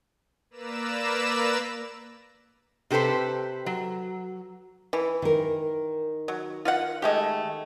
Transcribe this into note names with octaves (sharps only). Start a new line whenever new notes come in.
A#3 B4 D5 A#5 E6 E7
C3 G4 A4 B4 C5
F#3
E3
D#3 A#4
F#3
F4 F5 F#5
G#3 A3 G4